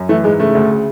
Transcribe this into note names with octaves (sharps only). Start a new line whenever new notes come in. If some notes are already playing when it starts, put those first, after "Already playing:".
Already playing: F#2
E3 A3
G#2 G#3
C#3 A3
D2
C#3